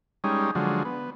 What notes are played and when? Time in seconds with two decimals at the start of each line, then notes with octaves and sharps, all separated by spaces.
0.24 G3 G#3 C#4 D#4
0.55 D3 F3 F#3 G#3
0.85 B3